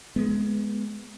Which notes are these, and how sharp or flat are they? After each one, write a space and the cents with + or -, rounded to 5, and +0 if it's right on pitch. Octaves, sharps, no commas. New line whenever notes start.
G#3 +15 B3 +0